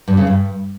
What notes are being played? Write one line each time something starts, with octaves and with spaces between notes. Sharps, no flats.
G2
C#3
G2